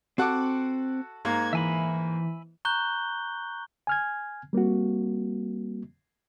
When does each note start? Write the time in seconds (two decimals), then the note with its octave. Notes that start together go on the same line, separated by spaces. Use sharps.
0.18 C4 F#4 A4 F#5 D6
1.25 G#2 A#3 A#5 G#6
1.53 E3 E5 G#5 B5
2.65 A#5 C#6 F#6 G6 G7
3.87 G#5 F6 G#6
4.53 G3 A#3 C4 F#4